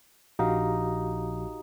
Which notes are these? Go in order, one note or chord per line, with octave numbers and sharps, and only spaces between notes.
A#1 D#4 F#4 G4 F5